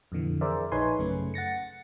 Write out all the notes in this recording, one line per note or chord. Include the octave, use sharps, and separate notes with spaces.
F2 A#2 D3 E3
G#4 A#4 C5 D5 E5
A#1 D#4 B4 C#5 G#5 C6
F#2 C#3 A3
F#5 A6 A#6 C#7